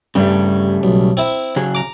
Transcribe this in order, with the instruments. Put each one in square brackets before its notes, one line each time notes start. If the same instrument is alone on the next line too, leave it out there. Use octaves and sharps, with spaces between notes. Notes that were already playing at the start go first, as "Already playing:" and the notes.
[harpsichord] G2 [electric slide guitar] C#3 G3 A3
[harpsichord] B1
C4 E4 E5
[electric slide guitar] C#3 F#3 G#4
[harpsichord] A#5 D6